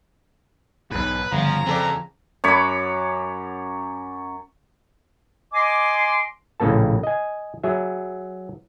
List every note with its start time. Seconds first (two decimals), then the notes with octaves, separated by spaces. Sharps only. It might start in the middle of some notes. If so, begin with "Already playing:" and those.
0.91 B1 G#2 B4
1.32 G1 C#3 F3 A#5
1.67 F2 C4 A4 D5
2.44 F#2 C#5 B5 D6
5.54 D#5 G#5 C6 D6
6.60 A#1 A2 C#3 A#3 A4 A5
7.03 D#5 G#5
7.63 F#3 G#4 E5